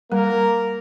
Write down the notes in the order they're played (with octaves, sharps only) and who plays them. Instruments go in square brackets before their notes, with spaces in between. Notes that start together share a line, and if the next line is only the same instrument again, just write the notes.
[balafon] G3 [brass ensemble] A#3 A#4